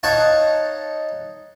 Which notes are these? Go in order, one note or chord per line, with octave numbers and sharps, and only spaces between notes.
D#4 C#5 F5 F#5 A5